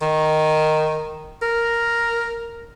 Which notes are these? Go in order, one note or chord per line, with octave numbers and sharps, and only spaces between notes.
D#3
A#4